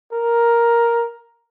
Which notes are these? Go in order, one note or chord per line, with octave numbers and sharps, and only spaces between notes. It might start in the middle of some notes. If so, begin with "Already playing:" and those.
A#4